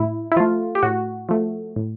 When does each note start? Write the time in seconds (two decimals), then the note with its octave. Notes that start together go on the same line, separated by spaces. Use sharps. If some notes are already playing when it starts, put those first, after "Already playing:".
Already playing: A2 E4
0.32 E4
0.36 F3 A3 F4
0.75 G4
0.83 A2 F#4
1.29 F3 A3
1.76 A2